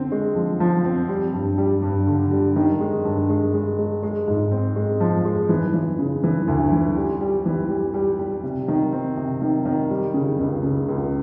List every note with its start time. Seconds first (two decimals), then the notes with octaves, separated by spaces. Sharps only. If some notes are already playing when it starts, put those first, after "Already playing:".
Already playing: D3 C4
0.12 G#3
0.35 F3
0.60 F3
0.84 C4
1.09 G3
1.33 G2
1.58 G3
1.82 G2
2.07 D3
2.32 G3
2.56 D#3
2.80 G#3
3.05 G2
3.29 G#3
3.53 G#3
3.78 G#3
4.03 G#3
4.28 G#2
4.51 C4
4.76 G#3
5.00 F3
5.25 G#3
5.49 E3
5.74 E3
5.99 C#3
6.24 E3
6.48 D2
6.72 E3
6.96 G3
7.21 G3
7.46 E3
7.70 G3
7.94 G3
8.19 G3
8.43 C3
8.68 D#3
8.93 C4
9.17 C3
9.42 D#3
9.65 D#3
9.91 G3
10.14 C#3
10.39 C#2
10.63 C#3
10.89 C#2